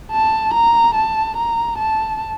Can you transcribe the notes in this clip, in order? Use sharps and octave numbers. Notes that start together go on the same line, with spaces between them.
A5
A#5
A5
A#5
A5